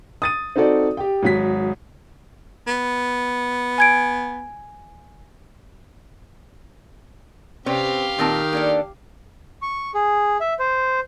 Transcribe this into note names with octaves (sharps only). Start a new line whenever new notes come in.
D#6 A6 D#7
C4 D#4 F#4 A4 D5
G4 G5
G#1 F#3 B6
B3
G#5 G#6 D7
C3 C4 C#4 G4 B4 F5
A#2 D#3 C4 A5
A#3 D4 A4
C#6
G#4
E5
C5